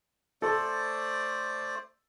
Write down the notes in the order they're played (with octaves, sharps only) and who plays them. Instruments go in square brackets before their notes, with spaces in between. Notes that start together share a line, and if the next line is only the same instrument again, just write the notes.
[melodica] A3 C5 D5 [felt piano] A4